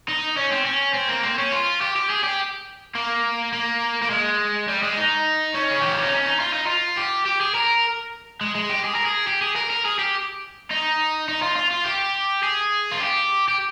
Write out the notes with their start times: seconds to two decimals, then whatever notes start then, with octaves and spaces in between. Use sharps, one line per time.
0.08 D#4
0.37 C#4
0.52 C4
0.66 C#4
0.94 C4
1.09 A#3
1.24 C4
1.38 C#4
1.52 F4
1.81 G4
1.96 G4
2.10 G#4
2.24 G4
2.95 A#3
3.53 A#3
4.02 A#3
4.10 G#3
4.68 G3
4.83 G#3
4.97 D#4
5.54 C#4
5.71 G#4
5.81 G4
5.91 F4
6.02 D#4
6.12 C#4
6.26 D#4
6.40 F4
6.53 D#4
6.67 F4
6.97 G4
7.26 G4
7.41 G#4
7.55 A#4
8.41 G#3
8.55 G#3
8.69 G4
8.84 G#4
8.95 A#4
9.05 G#4
9.27 G4
9.42 G#4
9.56 A#4
9.70 A#4
9.85 G#4
9.99 G4
10.71 D#4
11.29 D#4
11.42 F4
11.56 F4
11.71 F4
11.85 G4
12.43 G#4
12.92 F4
13.00 G4
13.48 G4